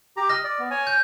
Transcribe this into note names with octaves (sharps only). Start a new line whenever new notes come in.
G4 A#5
D#5 F6 A#6
D5
B3
C#5 G#5
G6